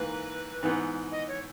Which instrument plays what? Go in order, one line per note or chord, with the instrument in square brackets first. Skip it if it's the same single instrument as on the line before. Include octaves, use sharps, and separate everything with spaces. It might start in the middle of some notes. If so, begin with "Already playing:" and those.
Already playing: [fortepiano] G#2 E3 A#3 [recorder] B4
[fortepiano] G#2 E3 B3
[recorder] D#5
C#5